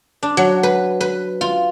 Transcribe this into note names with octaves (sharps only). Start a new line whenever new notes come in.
D4
F#3
B4
B4
F4